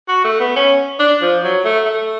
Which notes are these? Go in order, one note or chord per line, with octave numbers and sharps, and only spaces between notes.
F#4
A3
B3
C#4
D4
F3
F#3
A3
A3